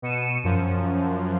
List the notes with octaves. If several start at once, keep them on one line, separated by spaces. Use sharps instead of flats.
B2 C#7 D#7 E7
F#2 F3